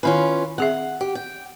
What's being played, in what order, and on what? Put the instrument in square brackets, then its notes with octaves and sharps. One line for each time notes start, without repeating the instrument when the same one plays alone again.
[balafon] D#3 E4 G#5 [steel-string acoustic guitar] C#4 F4 B4
[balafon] C4 G#4 E5 [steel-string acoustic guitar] F#5
[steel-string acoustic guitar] G4
G5